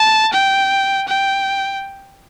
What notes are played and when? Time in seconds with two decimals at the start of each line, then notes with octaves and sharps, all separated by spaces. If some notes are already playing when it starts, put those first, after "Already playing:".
Already playing: A5
0.33 G5
1.08 G5